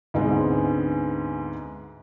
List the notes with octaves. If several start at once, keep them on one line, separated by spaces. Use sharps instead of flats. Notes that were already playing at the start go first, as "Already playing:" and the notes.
D2 G#2 D3 G#3 B3 C4